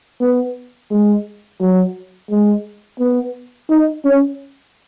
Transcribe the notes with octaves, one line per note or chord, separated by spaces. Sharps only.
B3
G#3
F#3
G#3
B3
D#4
C#4